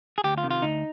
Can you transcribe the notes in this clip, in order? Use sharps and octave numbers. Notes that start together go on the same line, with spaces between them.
G#4
D2 G4
F4
C3 D#3
F4
D2 D#4